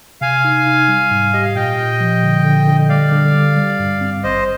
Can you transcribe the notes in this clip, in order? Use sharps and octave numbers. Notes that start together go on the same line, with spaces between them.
C3 F5 G#5
D#4
D#4
G3
G#2
G4 D#5
F5
A#2 D#5 G5
A#2
F3
D3
D3
D3
G3 D5 F5
D3
G3
G3
G2
C4
G#1 C5 D#5